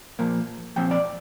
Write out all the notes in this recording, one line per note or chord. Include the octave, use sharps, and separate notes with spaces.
A#2 F3 A#3
A#2 F3 C4 G5
D5